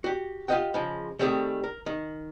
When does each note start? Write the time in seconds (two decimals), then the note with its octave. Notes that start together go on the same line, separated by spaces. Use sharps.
0.04 F#4 G4
0.48 F4 G4 C5 D#5 F#5 G5
0.74 C#3 F3 G#3
1.19 D#3 G3 A3 C4 G4 G#4
1.64 A#4
1.86 D#3